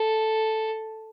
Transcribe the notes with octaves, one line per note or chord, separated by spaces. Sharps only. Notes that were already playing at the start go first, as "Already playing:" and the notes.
Already playing: A4